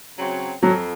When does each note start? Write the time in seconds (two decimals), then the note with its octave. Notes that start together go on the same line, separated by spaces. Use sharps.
0.17 C#3 F#3 C4
0.62 F2 F#3